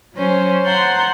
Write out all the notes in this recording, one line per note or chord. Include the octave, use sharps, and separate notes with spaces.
F#3 C#4 C5
F#5 A5 A#5 C6 G6